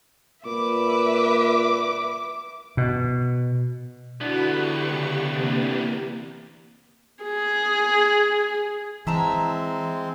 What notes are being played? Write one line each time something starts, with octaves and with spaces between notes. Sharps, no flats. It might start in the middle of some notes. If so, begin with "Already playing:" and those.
A#2 B4 E5 D6
B2
D2 D3 B3 E4 F#4 B5
G4 C#6 C#7
C#3
C3 E3 A#3 G4
G#4
E3 G#3 C4 E5 A5 A#5